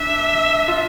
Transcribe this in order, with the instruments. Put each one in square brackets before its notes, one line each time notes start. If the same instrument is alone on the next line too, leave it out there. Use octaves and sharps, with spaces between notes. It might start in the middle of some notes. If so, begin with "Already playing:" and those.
Already playing: [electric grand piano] D4 [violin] E5
[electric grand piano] F4